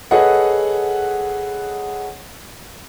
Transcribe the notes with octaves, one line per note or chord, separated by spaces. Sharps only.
G#4 A4 B4 C#5 D#5 F#5